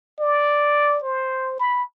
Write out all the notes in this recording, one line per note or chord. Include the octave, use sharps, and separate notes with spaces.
D5
C5
B5